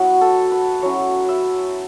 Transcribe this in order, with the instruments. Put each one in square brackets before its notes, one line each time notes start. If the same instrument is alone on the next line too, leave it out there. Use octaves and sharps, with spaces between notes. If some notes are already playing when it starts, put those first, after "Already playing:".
Already playing: [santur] F#3 B3 E4 F#4
A4
B4
F#3 C#4 E4 C#5
E5